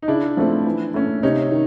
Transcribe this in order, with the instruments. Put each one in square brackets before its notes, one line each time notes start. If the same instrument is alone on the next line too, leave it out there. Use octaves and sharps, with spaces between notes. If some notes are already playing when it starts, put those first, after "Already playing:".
[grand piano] D#4
[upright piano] C#3 [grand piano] D4 E4
[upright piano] F3 A3 C4
E3
A3 C#4
[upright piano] C3 [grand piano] C#4 D#4
[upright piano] D#3